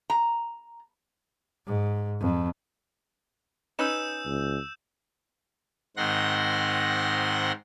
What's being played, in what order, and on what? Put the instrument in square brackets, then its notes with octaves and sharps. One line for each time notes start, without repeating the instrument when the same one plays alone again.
[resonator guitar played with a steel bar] A#5
[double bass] G#2
F2
[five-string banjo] C#4 D#4 B4 [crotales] E6 G6 E7
[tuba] C#2
[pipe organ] G#2 D#3 C4 F#5 C6 A#6